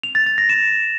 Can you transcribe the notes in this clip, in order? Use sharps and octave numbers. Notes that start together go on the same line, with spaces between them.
F7
A6
A6
A#6
E7